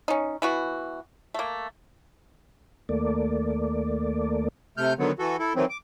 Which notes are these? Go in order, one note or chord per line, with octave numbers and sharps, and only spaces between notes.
C#4 D#4
E3 B3 F#4
A3 A#3
D#2 A3 A#3 D5
C3 A3 F6 G6
D3 D#3 F#3 B3
E3 F#4 A4
E4 A4
D#3 E3 F#3 C4
D6